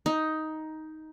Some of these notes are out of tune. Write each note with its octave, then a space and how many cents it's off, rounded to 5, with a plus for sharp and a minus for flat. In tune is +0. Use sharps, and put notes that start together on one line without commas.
D#4 +10